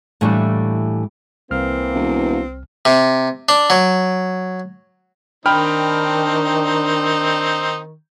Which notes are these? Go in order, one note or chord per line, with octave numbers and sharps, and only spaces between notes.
A2 E3 G3 A3 A#3 D4
C2 E3 A#3 C4 F6
E1
C3
D4
F#3
D#3 C4 D4 D#4 G5 B5 F6